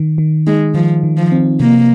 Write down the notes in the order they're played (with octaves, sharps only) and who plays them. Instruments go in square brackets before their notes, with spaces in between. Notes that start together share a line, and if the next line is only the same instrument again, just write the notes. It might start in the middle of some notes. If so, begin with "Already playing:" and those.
Already playing: [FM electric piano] D#3
D#3
[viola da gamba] G#3 [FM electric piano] D#4
[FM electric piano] D#3 [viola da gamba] F3
[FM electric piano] D#3
[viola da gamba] F3
[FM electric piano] C4
[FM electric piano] C3 [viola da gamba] A#3